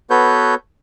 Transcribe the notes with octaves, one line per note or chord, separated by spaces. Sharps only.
B3 F#4 A4 B4 C#5 G6